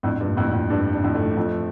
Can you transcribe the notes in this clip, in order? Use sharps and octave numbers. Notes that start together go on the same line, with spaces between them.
F2 A2 D4
G2
A#2
F2 A2
D4
F2
G2 D4
D4
F2 A2
A3
F2 F3